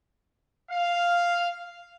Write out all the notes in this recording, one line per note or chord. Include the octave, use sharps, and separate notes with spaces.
F5